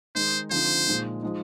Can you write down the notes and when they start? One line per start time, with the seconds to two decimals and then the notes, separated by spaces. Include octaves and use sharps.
0.15 D#3 G#3 D#4 C5
0.51 D3 F3 C4 D#4 C5
0.86 A#2 F3 G#3 D#4
1.22 F3 G#3 D#4